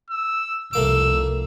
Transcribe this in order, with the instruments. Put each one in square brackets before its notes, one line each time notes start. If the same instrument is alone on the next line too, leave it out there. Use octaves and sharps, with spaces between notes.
[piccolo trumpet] E6
[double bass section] F1 C2 [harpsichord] A3 A#3 D6 [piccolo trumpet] E6